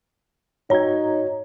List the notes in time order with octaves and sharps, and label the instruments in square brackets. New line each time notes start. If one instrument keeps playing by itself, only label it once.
[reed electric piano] G#2 F#4 G#6 [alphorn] D#4 [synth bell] C#5 A#5